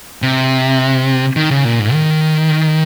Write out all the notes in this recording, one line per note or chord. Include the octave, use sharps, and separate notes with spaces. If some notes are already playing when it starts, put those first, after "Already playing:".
C3
D#3
C#3
A#2
G#2
D#3